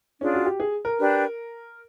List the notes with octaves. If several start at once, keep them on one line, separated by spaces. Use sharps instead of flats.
C#4 D4 F4 G#4
F#4
G4
G#4
A#4
D4 G4 B4